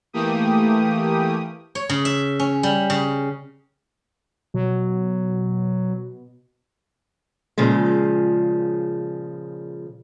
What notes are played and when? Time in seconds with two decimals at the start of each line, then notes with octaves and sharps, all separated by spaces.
0.13 E3 A3 A#3 G4 D#6
1.75 C#5
1.89 C#3
2.05 E5
2.40 C#4
2.63 G3
2.90 C#3
4.54 B2 F#3
7.58 A#2 C#3 F3 G#3